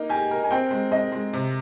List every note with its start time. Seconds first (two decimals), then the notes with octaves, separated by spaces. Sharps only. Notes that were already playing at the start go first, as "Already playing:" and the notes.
Already playing: A#3 D#4
0.09 G4 G#5
0.31 A#4
0.44 G#5
0.51 C4 G5
0.71 G#3
0.91 G#3 D#5
1.12 G#3
1.33 C3